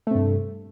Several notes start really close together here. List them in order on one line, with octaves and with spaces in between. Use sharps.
A3 C3 G2